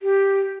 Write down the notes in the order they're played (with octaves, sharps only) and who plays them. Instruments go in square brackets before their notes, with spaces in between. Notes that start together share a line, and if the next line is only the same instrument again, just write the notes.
[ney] G4